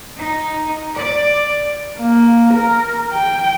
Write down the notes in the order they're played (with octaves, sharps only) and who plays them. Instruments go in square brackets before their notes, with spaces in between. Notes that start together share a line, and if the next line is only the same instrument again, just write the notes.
[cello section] D#4
D5
[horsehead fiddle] A#3
A#4
G5